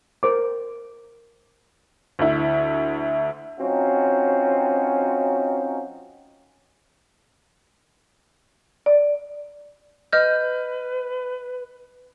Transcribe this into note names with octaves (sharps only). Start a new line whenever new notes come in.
A#4 C5 D6
D2 E4
F#3 C4 C#4 D#4 F4 F#4
D5
B4 D#5 F6 G6